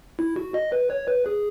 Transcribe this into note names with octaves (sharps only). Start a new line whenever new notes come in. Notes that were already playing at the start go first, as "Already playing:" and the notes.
E4
F#4
D#5
B4
C#5
B4
G#4